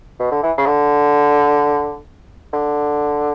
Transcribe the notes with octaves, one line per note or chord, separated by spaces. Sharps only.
B2
D3
E3
C#3
D3
D3